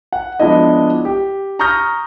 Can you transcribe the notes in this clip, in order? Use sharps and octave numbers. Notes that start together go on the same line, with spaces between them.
F#5
F3 G#3 B3 D4 E4 D#5
G4
A#5 C#6 D#6 F6 G6 A#6